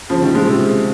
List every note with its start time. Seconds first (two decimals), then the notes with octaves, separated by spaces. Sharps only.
0.10 C#3 F3
0.22 D#3 G3
0.34 F3 G#3
0.47 C3
0.59 C3